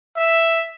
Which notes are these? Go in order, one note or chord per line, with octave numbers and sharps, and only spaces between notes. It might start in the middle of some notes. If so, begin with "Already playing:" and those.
E5